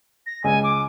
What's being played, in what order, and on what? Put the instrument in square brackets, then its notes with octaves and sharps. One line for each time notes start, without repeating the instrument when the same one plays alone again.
[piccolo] A#6
[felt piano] C#2 [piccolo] G#5
[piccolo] D6